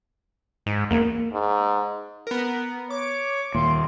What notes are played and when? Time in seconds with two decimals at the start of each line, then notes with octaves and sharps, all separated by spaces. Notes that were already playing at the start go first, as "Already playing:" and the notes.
0.66 G#2
0.91 E2 A#3
1.33 G#2
2.27 B3 A#4
2.90 C#5 D6
3.55 D#2 A#2 C6